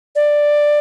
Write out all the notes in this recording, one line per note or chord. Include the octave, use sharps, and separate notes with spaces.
D5